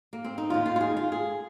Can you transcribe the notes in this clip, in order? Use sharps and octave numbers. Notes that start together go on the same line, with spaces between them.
A#3
C4
D#4
D#2 D#3 F4
F4
F4
G#4
F4
G#4